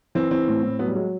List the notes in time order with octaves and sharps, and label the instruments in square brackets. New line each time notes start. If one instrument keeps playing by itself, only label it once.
[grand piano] E3 C4
E3 C4
A2
A2
F#3 B3
G3
F#3 G#3